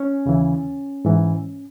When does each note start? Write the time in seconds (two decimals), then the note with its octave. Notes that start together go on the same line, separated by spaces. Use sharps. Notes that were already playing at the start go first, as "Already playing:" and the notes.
Already playing: C#4
0.26 D#2 C#3 E3
1.05 G#2 E3